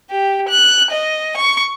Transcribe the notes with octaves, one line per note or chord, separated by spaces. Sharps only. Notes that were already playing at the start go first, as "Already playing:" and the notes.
G4
F#6
D#5
C#6